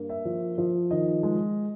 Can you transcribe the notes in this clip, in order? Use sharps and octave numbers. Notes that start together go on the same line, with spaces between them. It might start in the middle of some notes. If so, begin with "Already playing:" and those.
Already playing: G2 A#3
E5
F3
F3
D#3 D#5
G#3